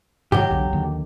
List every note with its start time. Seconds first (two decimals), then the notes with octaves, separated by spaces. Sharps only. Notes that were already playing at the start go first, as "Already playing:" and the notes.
0.32 G#2 C3 D#3 F#3 G4
0.50 B1 E2 D3
0.73 D#2 D3